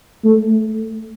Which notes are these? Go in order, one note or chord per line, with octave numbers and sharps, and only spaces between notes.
A3